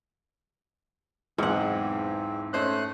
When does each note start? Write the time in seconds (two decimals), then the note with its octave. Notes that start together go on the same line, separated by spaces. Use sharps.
1.38 B1 E2 G#2 E3 C4 F#5
2.53 A3 C#4 C5 D#5 F#6